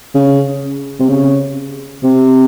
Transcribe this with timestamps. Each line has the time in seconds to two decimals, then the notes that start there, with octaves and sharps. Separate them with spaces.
0.15 C#3
1.00 C3
1.09 C#3
2.03 C3